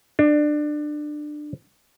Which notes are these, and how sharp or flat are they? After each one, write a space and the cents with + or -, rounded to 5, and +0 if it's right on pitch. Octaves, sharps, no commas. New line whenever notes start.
D4 +20